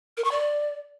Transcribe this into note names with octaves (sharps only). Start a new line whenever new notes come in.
A#4
C#6
D5